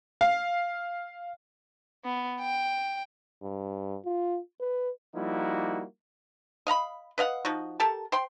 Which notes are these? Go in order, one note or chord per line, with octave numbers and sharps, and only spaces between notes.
F5
B3
G5
G2
F4
B4
F3 G3 A#3 D#4 E4 F#4
D#5 F5 A#5 B5
B4 D#5 F5 F#5
F3 D#4 F#4
G4 A4 A#4 A5
C5 G5 C6